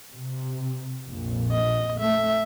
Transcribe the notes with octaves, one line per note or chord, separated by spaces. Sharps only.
C3
A#1 F2 A#2
D#5
A3 E5